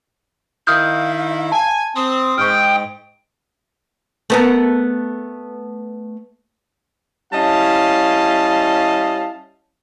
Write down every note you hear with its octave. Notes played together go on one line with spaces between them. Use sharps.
D#3 E4 F5 D#6 F6 G6
G#5 A5
C4 D#6
G#2 G5 C#6 F6
A3 B3 A#4
G3 C#4 E4 D#5 F5 A5